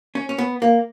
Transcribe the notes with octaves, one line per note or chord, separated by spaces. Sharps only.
C#4
C#4
B3
A#3